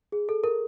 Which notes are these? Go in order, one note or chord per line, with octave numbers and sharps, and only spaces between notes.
G#4
A4
A#4